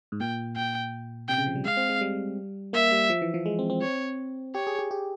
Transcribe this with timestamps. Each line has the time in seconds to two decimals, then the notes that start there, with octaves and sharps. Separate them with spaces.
0.12 G#2
0.20 A#2 G5
0.56 A#2 G5
1.28 C3 G5
1.38 C#3
1.47 F3
1.55 G3
1.65 G#3 F5
1.77 C4
1.89 G#3
2.01 G3
2.73 A#3 E5
2.92 G3
3.10 F3
3.22 E3
3.34 F3
3.46 G#3
3.59 C4
3.70 C4
3.82 C#5
4.55 G4 C#5
4.67 G#4
4.79 G4
4.91 G4